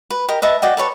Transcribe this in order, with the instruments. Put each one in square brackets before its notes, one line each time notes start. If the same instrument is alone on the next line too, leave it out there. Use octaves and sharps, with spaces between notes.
[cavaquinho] B4
G4 A#4 D#5
B4 D#5 E5 A5
F#4 D5 D#5 G5
A4 B4 C#5 A5